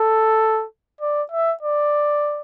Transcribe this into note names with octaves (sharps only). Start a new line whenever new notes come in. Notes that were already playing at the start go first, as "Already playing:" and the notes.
Already playing: A4
D5
E5
D5